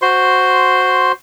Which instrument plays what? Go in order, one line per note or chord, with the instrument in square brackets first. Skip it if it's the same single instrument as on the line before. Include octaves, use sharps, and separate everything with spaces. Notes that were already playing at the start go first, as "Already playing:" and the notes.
[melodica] F#4 C5 C6